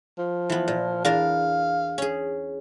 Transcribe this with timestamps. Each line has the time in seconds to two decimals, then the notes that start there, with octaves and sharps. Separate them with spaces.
0.19 F3
0.50 E3 B3
0.68 A#2
1.05 E2 D4 A#4 F5
1.98 C#4 G#4